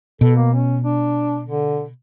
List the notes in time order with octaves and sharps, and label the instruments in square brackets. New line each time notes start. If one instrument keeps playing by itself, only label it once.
[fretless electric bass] B2 [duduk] A4
[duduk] A#3
C#4
D4
D3